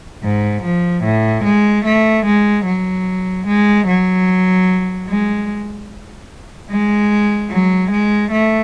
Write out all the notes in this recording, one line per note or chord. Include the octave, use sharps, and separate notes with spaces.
G#2
F3
A2
G#3
A3
G#3
F#3
G#3
F#3
G#3
G#3
F#3
G#3
A3